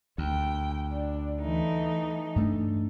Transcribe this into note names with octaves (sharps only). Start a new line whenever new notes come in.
D2 G5
D4
E3 A3 D#4
G2 A3 D4